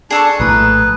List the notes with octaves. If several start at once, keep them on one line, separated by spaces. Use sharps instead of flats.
D4 G#4 A4 C#6
A#1 A2 A3 B4 A#5 D#6